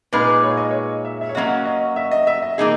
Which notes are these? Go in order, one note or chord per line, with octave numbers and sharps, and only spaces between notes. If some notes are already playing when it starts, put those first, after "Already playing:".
A#2 G#3 D#4 G#4 B4
C#5
D#5
C#5
E5
E5
C#5
F#3 A#3 C#4 F#4 D#5
D#5
E5
D#5
E5
D#5
E3 A#3 D#4 G#4